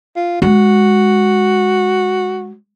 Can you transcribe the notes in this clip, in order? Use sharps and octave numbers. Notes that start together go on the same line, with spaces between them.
F4
G#3 F#4